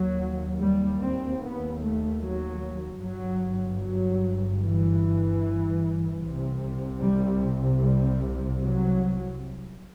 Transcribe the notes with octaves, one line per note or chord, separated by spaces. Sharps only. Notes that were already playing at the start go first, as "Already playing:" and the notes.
Already playing: D#2 F#3
G3
C4
B3
A3
F#3
G1 G2 F#3
F#3
E3
C2 C3
G3
G3
F#3